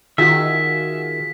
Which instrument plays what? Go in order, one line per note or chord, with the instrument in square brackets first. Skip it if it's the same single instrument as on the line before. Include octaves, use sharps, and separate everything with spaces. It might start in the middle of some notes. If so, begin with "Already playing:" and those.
[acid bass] D#3 [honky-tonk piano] F4 F#4 G#4 [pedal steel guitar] E5 [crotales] B6